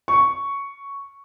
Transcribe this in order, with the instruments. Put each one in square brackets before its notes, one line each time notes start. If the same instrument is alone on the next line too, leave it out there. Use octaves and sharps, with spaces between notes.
[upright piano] C#6